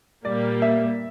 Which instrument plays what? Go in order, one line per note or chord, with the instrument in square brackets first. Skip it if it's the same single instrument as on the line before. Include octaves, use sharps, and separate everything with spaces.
[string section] A#2 G3 A#3 [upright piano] D5
[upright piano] E5